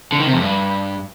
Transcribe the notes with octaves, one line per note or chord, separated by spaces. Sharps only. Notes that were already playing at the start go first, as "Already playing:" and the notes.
D3
D#3
C3
F2
G2